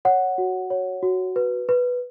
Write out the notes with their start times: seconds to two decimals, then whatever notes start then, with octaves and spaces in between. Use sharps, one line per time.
0.05 C#5 F#5
0.38 F#4
0.70 C#5
1.03 F#4
1.36 B4
1.69 B4